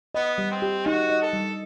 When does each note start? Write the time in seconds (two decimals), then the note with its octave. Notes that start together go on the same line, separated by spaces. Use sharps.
0.15 B3 D#5
0.38 G3
0.51 C4
0.62 G4
0.86 D#4 F#4
1.10 D#5
1.22 A4
1.33 G3